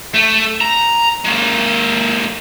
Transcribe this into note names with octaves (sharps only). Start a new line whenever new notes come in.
A3
A#5
G#3 A#3